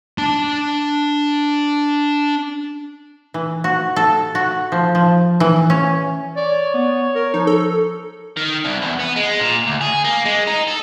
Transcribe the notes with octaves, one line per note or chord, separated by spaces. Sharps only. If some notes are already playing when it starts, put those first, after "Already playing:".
D4 A5
E3
F#4
A4
F#4
F3
F3
E3
C#4
C#5 D5
B3
A#4
F3 D#4
A4
D#3
C2
E2
B3
G#3
A#2
D2
G#4
A#3
G#3
D#4
A4